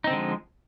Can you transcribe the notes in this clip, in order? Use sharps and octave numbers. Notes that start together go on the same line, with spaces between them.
D3 F3 G#3 C4 D#4